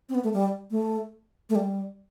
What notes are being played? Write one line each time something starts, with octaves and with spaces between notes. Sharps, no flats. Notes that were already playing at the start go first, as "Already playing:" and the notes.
C4
B3
A3
G3
A3
A3
G3